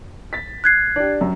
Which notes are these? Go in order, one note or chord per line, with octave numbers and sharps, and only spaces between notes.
A6 B6
F#6 G#6 C7
D4 G4
F#2